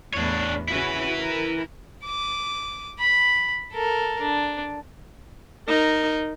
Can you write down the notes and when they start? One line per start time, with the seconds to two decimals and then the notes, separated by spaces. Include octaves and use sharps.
0.14 E2 A2 B3 D4 C#5
0.68 C#3 C#4 E4 F#4 B4
1.17 A#4
2.05 D6 D#6
3.00 B5
3.72 A4 A#4
4.21 D4
5.68 D#4 A#4